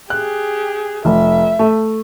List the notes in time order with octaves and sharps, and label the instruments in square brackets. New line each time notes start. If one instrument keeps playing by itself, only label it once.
[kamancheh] G4 G#4 [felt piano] F#6
[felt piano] F1 [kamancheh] E5
[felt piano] A3